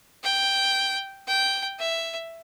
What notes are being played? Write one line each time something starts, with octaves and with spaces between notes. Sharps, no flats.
G5
G5
E5